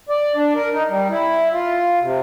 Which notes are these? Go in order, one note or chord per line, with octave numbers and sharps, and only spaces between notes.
D5
D4
A#4
D#4
G3
E4
F4
C3